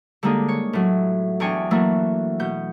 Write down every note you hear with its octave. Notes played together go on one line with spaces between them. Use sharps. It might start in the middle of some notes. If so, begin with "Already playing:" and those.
D3 G3 G#3 A#3 D#4 G#4
C#5
A2 F#3
E2 D4 G5 G#5 C#6
E3 F#3 A3 A#3 E4
B2 G6